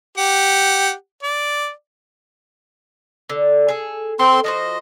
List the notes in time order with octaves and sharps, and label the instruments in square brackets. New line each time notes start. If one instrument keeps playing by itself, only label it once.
[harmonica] G4 F#5
D5
[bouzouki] D3
G#4 A4
[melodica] C4 C6 [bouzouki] A4
[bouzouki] F3 F#4 C5 [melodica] D#5